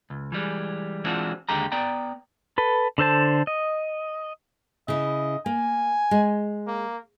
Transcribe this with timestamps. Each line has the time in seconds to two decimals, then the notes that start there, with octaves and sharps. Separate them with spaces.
0.10 C#2
0.32 E3 F3 G3 G#3
1.04 E3 G#3 C4 D4 F4 F#4
1.49 D#2 D3 G#3 G4 A#5
1.72 B3 D5 G5 A#5
2.58 A4 B4
2.98 D3 A4 C5 A5
3.47 D#5
4.88 C#3 E4 D#5
5.46 A#3 G#5
6.11 G#3
6.67 A#3